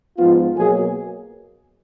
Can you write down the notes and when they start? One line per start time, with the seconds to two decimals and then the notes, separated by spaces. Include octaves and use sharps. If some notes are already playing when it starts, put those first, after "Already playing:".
0.18 G#2 F3 B3 F4
0.57 B2 F#3 A#3 G#4